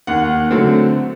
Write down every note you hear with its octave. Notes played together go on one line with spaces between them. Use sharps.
D#2 F#5
D3 F#3 A3 C4